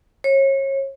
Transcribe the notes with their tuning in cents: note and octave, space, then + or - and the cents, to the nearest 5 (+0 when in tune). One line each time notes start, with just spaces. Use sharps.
C#5 -30